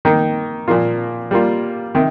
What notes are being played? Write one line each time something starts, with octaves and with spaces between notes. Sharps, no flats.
D#3 A#3 D#4
A#2 F3 A#3 F4
G3 A#3 F4
C3 D#3